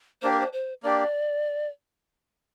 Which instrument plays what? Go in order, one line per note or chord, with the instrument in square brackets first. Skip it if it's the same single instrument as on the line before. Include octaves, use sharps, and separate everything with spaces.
[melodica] A#3 D4 G4 [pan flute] C5
[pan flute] A#4
C5
C5
[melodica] A#3 D4 G4 [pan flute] D5